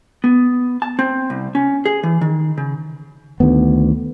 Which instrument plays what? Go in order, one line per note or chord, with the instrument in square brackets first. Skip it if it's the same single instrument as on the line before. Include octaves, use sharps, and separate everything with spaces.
[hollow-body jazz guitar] B3
A5
C4
C2
C#4
G#4
E3
D#3
C#3
[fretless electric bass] D2 D#3 B3